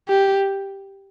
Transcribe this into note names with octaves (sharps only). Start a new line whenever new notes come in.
G4